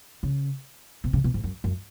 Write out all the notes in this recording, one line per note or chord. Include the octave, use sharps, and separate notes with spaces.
C#3
B2
C#3
B2
G#2
F#2
F#2